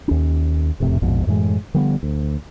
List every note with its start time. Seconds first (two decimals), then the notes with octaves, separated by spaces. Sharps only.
0.08 D#2 C#4
0.80 E1 F2 A2 C3
1.02 A#1 F2 G#2 B2
1.27 F#2 A2 E3 G#3
1.74 D3 F3 G3 B3
2.03 D2